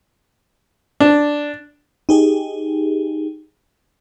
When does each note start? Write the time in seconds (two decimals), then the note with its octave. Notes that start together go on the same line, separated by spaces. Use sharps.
1.00 D4
2.09 D#4 G4 G#4